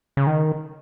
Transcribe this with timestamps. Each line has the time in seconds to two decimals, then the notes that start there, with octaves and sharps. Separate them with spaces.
0.17 C#3
0.27 D#3